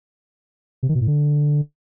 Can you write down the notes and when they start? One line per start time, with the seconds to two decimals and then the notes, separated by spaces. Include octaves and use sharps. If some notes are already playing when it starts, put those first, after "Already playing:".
0.83 C3
0.89 D#3
0.95 B2
1.01 A2
1.07 D3